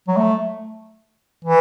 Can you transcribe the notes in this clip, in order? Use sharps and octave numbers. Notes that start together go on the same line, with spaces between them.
F#3
A3
E3